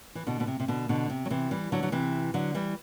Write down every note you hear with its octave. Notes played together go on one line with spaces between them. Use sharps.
E3
B2 D3
B2
C3
C3
B2 D3
B2 D3
C3
F#3
C3 E3
E3 G3
D3 F#3
F#3
C3 E3
D3 F#3
E3 G3